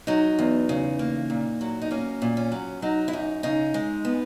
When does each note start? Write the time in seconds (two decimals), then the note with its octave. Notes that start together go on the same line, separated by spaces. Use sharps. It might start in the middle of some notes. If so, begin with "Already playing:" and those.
0.07 F#3 D#4
0.39 E2
0.69 C#3
0.99 A#3
1.30 A#2
1.61 F#3
1.82 D#4
1.91 A#3 C#4
2.22 A#2
2.37 C#4
2.52 F#3
2.82 F#3 D#4
3.08 E4
3.13 F#2 D#4
3.43 C#3 D#4
3.74 G#3
4.05 B3